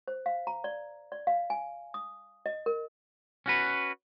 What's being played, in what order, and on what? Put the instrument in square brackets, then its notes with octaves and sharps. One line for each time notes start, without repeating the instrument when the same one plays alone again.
[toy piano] C5
F5
A#5
D5
D5
F5
G#5
D#6
D#5
A#4
[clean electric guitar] C#4 F#4 B4